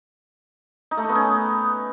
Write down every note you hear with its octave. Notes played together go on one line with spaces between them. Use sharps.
D#4
A3
D#4
B3
C#4